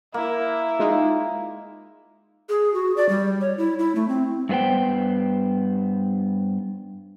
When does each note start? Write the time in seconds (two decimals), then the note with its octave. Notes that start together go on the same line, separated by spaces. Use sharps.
0.14 A#3 E4
0.79 G#3 D#4 F4
2.49 G#4
2.74 F#4
2.97 D5
3.09 G3
3.41 C#5
3.58 E4
3.79 E4
3.95 A3
4.08 C4
4.49 G2 A3 B3 C5 G5